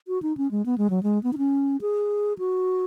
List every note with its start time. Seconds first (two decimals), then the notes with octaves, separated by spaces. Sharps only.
0.08 F#4
0.22 D#4
0.37 C#4
0.51 G#3
0.66 B3
0.78 G#3
0.90 F#3
1.03 G#3
1.23 B3
1.33 D#4
1.38 C#4
1.81 G#4
2.39 F#4